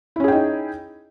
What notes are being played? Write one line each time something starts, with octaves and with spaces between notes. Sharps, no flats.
C#4 D#4 E4 G#4 G5